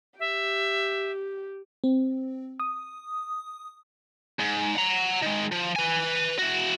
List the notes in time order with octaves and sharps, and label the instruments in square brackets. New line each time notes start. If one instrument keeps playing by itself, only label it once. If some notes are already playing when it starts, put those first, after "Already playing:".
[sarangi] G4 [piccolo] E5
[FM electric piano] C4
D#6
[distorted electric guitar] G#2
F#5 A#5
D#3 G#3
F3
B4 G#5
E4 F#4